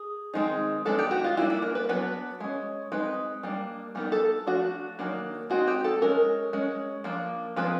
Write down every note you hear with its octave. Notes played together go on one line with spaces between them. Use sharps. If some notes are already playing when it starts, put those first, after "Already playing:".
Already playing: G#4
D#3 G#3 C4 D#4
D#3 G#3 B3 D4 A4
G4
F#4
F4
G3 A#3 D4 E4
E4
A#4
B4
F#3 B3 D4 B4
G#3 C#4
G#3 C4 D#4 B4
G3 A#3 D4
G3 B3 D#4 A#4
A4
F3 A3 D4 F#4
D#3 F#3 A#3 D4
G#3 C4 D#4 F#4
G4
A4
G#3 C#4 A#4
G#3 C#4
F3 A#3 D4
F3 G#3 C4 B4